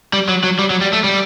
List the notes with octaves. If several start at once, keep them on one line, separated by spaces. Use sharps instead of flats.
G3
F#3
F#3
G3
F#3
G3
A3
G3